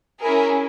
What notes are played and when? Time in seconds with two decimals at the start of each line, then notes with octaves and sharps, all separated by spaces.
0.20 C#4 E4 G#4 A#4